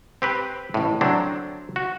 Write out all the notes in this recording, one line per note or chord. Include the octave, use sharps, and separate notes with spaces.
C4 G4 B4
A1 A2
D3 F#3 C4 D4
F#4